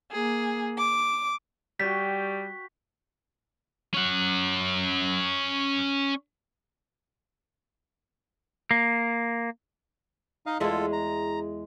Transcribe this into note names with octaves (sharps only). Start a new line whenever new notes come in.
A#3 G#4
D6
G3 F#4 C#5 G5 B6
C#4 F#5
A#3
D#4 D#5 F5
E2 G#3 E4 F4 A4
A#5